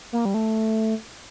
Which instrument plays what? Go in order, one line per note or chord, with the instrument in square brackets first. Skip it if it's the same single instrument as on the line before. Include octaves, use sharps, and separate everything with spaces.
[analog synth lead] A#3
G3
A3